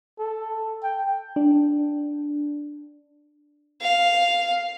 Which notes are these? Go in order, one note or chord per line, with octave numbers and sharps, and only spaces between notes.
A4
G5
D4
F5